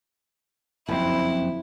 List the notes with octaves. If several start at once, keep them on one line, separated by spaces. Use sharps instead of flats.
F#1 F2 C4 E4